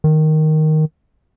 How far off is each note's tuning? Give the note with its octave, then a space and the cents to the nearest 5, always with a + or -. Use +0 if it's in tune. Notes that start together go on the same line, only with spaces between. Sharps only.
D#3 +0